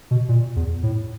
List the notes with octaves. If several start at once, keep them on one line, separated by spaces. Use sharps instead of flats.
B2
A#2
E2
A2